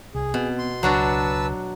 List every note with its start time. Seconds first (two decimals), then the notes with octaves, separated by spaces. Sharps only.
0.15 C2 G#4
0.34 B2 B3 C4
0.59 C6
0.83 C#2 F#3 D4 F#4 B4 A5 E6